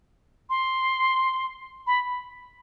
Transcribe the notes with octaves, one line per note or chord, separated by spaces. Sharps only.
C6
B5